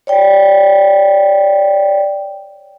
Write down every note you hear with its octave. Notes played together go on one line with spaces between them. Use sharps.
C#5 D5 G5